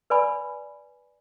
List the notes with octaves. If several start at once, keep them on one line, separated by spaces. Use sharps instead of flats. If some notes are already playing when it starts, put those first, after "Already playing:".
B4 D5 G#5 B5